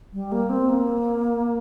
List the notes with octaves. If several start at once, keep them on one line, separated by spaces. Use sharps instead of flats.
G3
A#3
C4
A#3